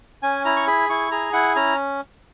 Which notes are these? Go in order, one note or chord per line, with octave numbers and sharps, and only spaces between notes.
C#4 G#5
E4 A#5
C#6
G#4 B5
E4 C#6
G#4 A#5
E4 F#5
C#4 A#5